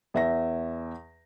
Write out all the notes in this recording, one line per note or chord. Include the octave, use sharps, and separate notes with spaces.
E2 E5 A#6